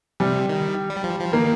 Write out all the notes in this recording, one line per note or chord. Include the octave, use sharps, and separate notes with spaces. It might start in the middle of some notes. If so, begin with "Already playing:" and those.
C3 G3
D#3
G3
F3
F3
D#3 A#3